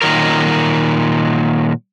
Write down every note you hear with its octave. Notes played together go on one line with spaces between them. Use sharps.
A#2 D#3 F#3 A#4